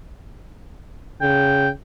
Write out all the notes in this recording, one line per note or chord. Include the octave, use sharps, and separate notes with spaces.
C#3 G5